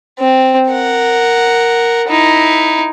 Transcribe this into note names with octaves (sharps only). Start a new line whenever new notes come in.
C4
A#4 F#5
D#4 E4